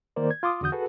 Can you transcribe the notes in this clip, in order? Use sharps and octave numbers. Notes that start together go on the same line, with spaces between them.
D#3 A#3 A#4 C5 D5
G#6
F4 C6 D6 D#6
E2 D3 F#4 D#6 G6
F#4 G#4 A4 B4